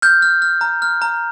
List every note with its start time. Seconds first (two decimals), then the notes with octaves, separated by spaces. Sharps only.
0.02 F6 G6
0.22 F6
0.42 F6
0.61 A#5
0.82 F6
1.02 A#5